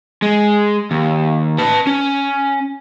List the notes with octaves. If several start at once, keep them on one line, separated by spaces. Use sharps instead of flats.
G#3
D#2
B4 A5
C#4